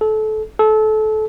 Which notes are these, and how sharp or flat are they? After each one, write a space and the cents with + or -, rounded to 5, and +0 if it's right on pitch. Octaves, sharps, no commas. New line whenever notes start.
A4 -25
A4 -25